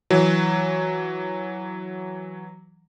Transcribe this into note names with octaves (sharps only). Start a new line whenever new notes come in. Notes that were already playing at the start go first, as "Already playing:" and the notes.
E3 F#3